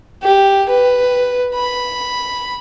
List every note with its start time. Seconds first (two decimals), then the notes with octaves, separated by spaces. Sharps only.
0.23 G4
0.69 B4
1.55 B5